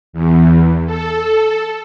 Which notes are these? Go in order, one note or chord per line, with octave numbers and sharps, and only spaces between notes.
E2
A4